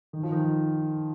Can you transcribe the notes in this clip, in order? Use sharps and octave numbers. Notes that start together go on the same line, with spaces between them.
D#3
F3
D#3